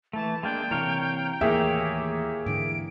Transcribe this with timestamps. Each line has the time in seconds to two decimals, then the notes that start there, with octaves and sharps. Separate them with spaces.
0.13 E3 A3 A5
0.43 G#3 A#3 D4 G5
0.71 C3 E3 A#4 C#5 F5
1.41 D#2 A2 E3 A#3 G4 G#4 C#5 E5
2.46 G#2 D3 E3 D7